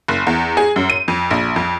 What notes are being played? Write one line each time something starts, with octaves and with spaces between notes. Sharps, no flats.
F#1
E2
G#4
F#2
D#7
F2
A#1
F2